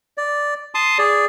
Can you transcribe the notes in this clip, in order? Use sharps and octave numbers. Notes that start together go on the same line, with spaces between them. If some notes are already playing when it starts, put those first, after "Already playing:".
D5
A5 C6 D#6
G#4 D5